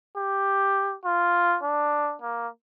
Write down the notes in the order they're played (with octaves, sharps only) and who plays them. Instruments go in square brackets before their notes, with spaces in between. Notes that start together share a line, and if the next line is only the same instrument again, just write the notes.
[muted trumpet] G4
F4
D4
A#3